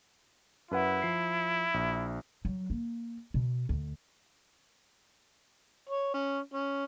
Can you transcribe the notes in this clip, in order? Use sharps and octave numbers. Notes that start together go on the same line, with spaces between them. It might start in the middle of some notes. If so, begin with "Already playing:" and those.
F#2 E4 B4 F#5
F3 C7
A#1
F#3
A#3
B2
D2
C#5
C#4
C#4